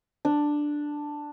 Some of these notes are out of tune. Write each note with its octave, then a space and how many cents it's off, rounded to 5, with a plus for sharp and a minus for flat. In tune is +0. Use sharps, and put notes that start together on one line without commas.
D4 +5